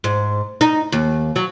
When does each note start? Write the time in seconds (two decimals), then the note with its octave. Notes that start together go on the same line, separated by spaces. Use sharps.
0.04 G#2
0.61 D#4
0.92 D#2
1.36 F#3